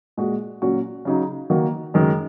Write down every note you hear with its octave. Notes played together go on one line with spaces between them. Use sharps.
A#2 G#3 F#4
A#2 F#3 C#4 F#4
C#3 F#3 D#4
D#3 F#3 A#3 F#4
F#2 D#3 G#3